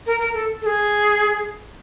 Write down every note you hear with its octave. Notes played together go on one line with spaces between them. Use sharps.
A#4
A#4
A4
A4
G#4